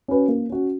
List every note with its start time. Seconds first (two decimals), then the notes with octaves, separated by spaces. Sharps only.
0.08 C#4 F#4 B4
0.28 A#3
0.49 C#4 F#4